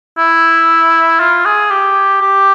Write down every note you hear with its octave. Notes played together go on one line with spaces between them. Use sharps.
E4
F4
G#4
G4
G4